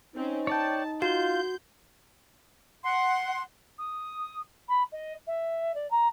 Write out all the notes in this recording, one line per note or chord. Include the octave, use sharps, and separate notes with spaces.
C4 C#4 D#4
C#5 D5 G5 A5
F4 F#4 G6
F#5 C6
D#6
B5
D#5
E5
D5
A#5